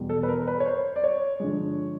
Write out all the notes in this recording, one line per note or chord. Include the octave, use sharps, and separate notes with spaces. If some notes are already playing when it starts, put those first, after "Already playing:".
Already playing: E2 B2 G3
A4
B4
A#4
B4
C#5
C5
D5
C#5
G2 D3 F3 G#3